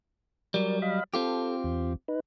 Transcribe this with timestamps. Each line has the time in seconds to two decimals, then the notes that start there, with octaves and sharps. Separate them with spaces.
0.54 F#3 G3 A#4 D5
0.82 D#5 F5 B5
1.14 C4 F4 G4 A4
1.64 E2
2.08 D#4 B4